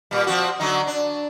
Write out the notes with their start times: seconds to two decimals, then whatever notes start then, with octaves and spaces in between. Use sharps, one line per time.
0.11 A#2 G3
0.27 F3 C4 F#4
0.60 D3 F#3 D#4
0.87 D4